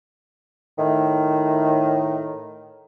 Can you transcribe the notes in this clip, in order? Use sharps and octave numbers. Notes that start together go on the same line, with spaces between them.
A2 D#3